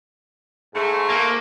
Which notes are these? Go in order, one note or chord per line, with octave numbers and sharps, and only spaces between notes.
G#2 A3 G#4
A#3